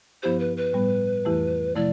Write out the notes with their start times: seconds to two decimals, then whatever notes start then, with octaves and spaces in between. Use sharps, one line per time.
0.23 G2 F3 B3 E4 G4 C5
0.40 B4
0.57 B4
0.73 A2 G3 B3
1.25 F2 E3 A3 E4 G4
1.75 C3 F3 A3 E4 D5